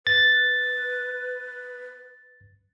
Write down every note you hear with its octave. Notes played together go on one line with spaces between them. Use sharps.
B4 A6